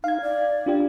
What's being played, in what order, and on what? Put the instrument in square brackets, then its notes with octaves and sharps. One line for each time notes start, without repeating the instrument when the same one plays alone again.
[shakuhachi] D#4 [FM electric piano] F5 G#6
[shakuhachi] D5
[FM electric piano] D4 F4 G4